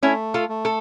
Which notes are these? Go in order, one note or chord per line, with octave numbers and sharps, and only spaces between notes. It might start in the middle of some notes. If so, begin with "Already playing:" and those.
A3 C#4 E4
F4 A4
A3
A4